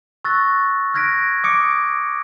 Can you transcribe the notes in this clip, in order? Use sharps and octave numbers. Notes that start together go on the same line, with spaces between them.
C#6 E6 F#6 A6 A#6
F6 F#6 G#6 A#6 B6 D7
D6 D#6 G#6 C#7 D7